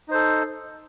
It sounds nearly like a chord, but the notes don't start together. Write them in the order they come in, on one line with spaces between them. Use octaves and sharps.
D#4 C5 A4